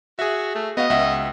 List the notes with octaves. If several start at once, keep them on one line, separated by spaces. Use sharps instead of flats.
F#4 G#4 E5
A3
B3 F#4 D#5 F5
C#2 E5 F#5